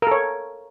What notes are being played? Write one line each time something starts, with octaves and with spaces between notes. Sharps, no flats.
A4 A#4 C#5